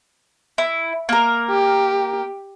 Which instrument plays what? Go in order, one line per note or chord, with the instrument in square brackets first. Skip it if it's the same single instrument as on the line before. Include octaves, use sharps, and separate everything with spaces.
[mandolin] E4
A#3 A#4
[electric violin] G4